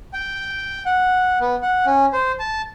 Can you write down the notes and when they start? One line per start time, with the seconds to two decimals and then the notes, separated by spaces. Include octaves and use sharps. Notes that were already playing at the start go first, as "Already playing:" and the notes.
0.14 G5
0.86 F#5
1.41 B3
1.62 F#5
1.86 C#4
2.13 C5
2.39 A5